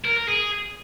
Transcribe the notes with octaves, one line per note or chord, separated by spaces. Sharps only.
A#4
A#4
G#4